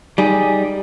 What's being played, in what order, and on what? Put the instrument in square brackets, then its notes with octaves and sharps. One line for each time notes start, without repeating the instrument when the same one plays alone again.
[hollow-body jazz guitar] G3 D#4 G#4